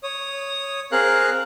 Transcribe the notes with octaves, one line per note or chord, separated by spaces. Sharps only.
C#5 D#6
C4 G#4 A#4 F5 F#6